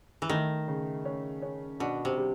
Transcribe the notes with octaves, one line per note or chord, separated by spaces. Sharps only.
E3
D#3 A3
C#3
C#4
C#4
B2 D4
C3
G3